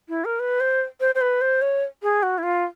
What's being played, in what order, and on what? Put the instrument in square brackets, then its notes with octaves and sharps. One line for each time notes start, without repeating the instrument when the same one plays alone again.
[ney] E4
A#4
B4
C5
C5
C5
B4
C5
C#5
G#4
F#4
E4
F4